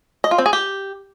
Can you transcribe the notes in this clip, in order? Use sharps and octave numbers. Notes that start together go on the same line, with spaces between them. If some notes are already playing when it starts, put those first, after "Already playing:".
D#5
F4
C4
G#4
G4